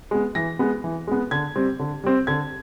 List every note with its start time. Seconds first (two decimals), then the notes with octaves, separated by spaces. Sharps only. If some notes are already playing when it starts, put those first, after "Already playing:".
0.11 G#3 B3
0.35 E3 A#6
0.59 G#3 B3
0.84 E3
1.07 G#3 B3
1.31 D3 G#6
1.56 G3 C4
1.79 D3
2.04 G3 C4
2.27 D3 G#6